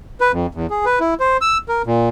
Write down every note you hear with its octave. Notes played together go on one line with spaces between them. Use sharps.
B4
F2
E2
G#4
B4
E4
C5
E6
A#4
A#2